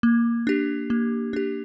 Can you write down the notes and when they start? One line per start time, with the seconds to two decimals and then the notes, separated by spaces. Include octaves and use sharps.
0.03 A#3
0.47 D4 G4
0.90 A#3
1.33 D4 G4